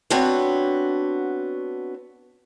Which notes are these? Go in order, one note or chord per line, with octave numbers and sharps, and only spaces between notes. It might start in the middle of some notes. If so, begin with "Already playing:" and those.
B3 C4 D4 F#4 C#5